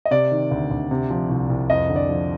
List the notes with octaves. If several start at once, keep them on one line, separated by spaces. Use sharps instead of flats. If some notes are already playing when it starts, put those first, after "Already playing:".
D#5
C3 D5
D#3
D2
D2
C3
F3
C2
C2
F2 D#5
D3
D5
F3